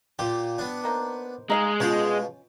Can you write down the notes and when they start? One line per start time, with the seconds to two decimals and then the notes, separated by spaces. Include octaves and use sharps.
0.19 A#2 F4 G4
0.58 B3 D4
0.84 D#3 A#3 C5
1.50 G#3 D#4 E5 F5
1.80 B2 C#4 F4 G5